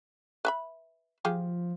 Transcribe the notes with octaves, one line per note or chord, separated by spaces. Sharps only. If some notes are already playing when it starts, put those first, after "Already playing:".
B4 E5 B5
F3 F4 G4 G#4